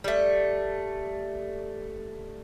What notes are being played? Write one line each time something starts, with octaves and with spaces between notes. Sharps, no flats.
G3 A3